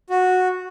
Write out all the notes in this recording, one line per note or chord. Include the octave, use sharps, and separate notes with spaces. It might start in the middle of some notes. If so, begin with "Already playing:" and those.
F#4